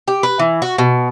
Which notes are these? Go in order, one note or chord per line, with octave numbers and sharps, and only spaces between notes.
G4
B4
E3
F#4
B2